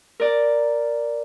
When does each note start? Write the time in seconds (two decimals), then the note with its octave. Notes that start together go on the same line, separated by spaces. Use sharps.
0.20 A#4 D5